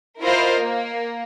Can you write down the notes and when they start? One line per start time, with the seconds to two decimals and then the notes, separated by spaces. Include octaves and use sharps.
0.21 E4 F4 A#4 C5 D#5 F5
0.59 A#3